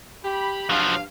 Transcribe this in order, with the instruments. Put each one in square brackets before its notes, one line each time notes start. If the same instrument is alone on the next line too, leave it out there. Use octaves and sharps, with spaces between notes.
[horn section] G4 B5
[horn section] G2 F5 [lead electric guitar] F3 F#3